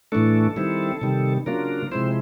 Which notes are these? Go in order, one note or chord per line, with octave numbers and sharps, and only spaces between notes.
A2 E3 A3 D4 A4
D#3 G3 C4 E4
C3 D#3 G3
C#3 F#3 A#3 D4 F4 A#4
C3 F3 G#3 C4 E4 C5